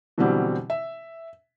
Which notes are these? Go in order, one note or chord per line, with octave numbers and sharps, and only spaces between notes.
B2 D3 E3 F#3 G3 C4
E5